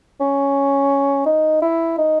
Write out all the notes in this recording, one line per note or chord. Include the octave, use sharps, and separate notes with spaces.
C#4
D#4
E4
D#4